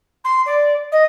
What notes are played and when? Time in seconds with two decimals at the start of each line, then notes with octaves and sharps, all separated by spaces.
0.24 C6
0.45 D5
0.91 D#5